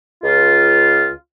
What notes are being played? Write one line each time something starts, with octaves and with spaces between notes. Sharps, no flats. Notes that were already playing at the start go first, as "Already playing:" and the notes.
C#2 F4